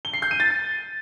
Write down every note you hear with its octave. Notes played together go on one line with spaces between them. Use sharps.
G7
C7
G6
D#7
A6